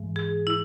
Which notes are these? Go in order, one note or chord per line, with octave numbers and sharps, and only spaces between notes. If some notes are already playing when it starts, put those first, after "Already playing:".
Already playing: G#2 E3 G#3
G#4
E4